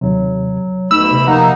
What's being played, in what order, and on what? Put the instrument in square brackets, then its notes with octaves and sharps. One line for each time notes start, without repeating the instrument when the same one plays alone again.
[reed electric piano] D#2 C3 [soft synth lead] F#3
[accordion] D2 B2 B5 [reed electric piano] A3 D#4 [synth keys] E6
[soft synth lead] C3
[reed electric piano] F3 F#5 A#5 [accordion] A#3 D#4